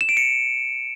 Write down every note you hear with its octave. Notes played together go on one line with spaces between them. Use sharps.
E7
D7
C#7